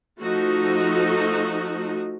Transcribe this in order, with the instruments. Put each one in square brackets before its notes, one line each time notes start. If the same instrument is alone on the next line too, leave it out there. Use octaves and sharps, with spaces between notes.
[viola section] F3 A3 D#4 F#4